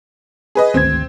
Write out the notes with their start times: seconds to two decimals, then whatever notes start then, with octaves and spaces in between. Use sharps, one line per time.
0.55 G#4 B4 D#5
0.74 G#1 D2 C4 G#6